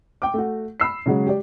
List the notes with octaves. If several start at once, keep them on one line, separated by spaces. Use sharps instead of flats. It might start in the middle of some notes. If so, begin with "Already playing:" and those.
G5 D6
A3 F#4
B5 E6 C7
C#3 F#3 G#3
G4 D5